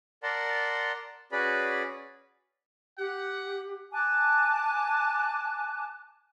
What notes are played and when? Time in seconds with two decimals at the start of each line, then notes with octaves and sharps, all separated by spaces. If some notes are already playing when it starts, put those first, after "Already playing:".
0.23 A#4 D5 F#5 A5 A#5 C6
1.32 C#4 F#4 G#4 B4 D5 B5
2.98 G4 F#5
3.92 G#5 A5 D6 F#6